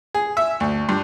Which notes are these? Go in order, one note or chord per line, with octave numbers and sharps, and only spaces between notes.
G#4
E5
D2
G2